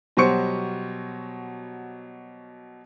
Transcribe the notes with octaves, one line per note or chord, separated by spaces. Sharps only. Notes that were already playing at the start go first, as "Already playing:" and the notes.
B2 F#3 G3 C5 C#6 C#7